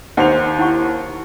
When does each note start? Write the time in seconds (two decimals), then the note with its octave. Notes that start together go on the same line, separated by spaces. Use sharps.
0.17 D#2 C5 F#5 F7
0.59 E4 F#5 C#6